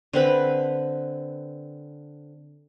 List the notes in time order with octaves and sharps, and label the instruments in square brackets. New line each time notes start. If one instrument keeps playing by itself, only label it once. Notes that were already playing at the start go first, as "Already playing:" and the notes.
[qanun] D3 C4 B4 B5